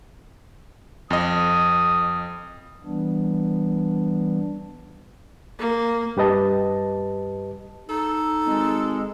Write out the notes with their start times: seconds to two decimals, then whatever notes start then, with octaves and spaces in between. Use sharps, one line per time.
1.10 F2 D#5 D#6
2.85 E3 G3 B3 D4
5.59 A#3
6.17 G2 G4 B4 D#5 A5
7.90 D#4 A4
8.46 G#1 G#3